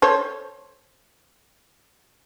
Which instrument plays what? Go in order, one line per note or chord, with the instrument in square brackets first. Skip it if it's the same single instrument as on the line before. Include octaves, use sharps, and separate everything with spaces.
[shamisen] A4 C5 C#5